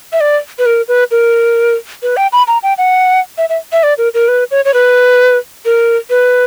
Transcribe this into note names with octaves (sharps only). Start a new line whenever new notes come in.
E5
D5
B4
A#4
B4
A#4
B4
G5
B5
A#5
G5
F#5
E5
E5
E5
D5
A#4
A#4
B4
C#5
C#5
B4
A#4
B4